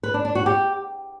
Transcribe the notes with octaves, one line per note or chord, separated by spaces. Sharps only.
B4
D4
D4
F#4
G4